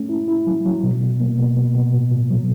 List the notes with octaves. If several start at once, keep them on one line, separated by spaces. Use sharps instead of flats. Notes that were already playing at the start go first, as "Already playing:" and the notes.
Already playing: A3 C#4
E4
E4
F#3
F#3
B2
B2
A#3
B2
B2
B2
A#2
A#2
F#3